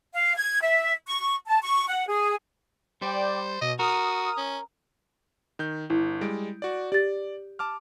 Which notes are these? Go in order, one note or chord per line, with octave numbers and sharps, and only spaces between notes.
F5
G#6
E5
C#6
A5
C#6
F#5
G#4
G3 C5 D5 G5 D6
B2 D#5
F#4 A#4 D#6 F6
C#4
D#3 G6
G1 E4
G3 G#3 D7
F#4 D5
G4 D5 A6
A5 D6 F6